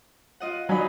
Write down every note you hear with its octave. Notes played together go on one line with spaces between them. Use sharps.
F4 D#5 F#5
F#3 D#4 G#5 B5